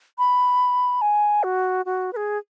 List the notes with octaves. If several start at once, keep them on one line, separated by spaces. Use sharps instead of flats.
B5
G#5
F#4
F#4
B4
G#4